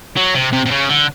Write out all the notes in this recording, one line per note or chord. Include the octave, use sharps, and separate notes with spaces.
F#3
C3
C3
C3
C#3
D3